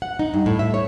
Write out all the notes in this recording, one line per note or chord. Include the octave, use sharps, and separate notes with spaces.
F#5
D#4
G2
A2
E5
C#5